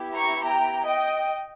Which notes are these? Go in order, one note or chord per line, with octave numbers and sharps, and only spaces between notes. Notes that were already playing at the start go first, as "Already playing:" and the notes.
Already playing: B3 E4 G4
A#5 C#6
G5 A#5
D#5 G5